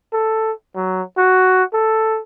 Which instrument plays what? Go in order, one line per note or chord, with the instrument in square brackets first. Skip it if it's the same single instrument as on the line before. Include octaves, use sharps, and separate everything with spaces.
[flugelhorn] A4
F#3
F#4
A4